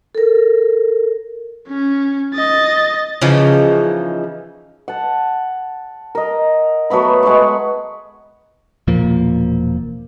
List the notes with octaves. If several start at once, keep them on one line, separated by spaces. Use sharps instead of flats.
A4 A#4
C#4
D#5 A6
C#3 E3 F3 D#4
F#5 A5
A#4 D#5
F#3 A3 B3 B5
G#3 B4 B5 C#6
E1 A#2 F3 A#3